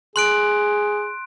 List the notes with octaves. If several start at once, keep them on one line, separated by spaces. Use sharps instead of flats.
G#4 C6 F#6 D7